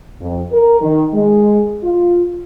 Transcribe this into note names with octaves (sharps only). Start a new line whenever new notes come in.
F2
A#4
D#3
G#3
F4